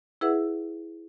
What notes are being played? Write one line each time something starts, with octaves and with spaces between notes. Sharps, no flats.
E4 G#4 B4 E5 F#5 E6